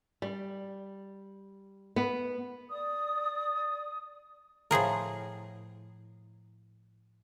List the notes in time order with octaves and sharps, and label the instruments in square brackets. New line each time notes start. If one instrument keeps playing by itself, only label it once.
[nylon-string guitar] G3
B3
[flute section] D5 D#6
[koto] A2 F3 G#4 A#4